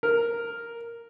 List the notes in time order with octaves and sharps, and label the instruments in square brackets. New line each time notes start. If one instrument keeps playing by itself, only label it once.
[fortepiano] A#4